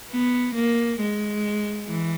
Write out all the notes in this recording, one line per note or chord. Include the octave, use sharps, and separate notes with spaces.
B3
A#3
G#3
E3